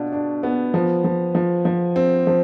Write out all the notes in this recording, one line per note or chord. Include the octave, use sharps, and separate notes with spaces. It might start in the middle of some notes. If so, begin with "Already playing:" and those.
Already playing: B2 D4 F4
D4
B3
F3
F3
F3
F3
C4
F3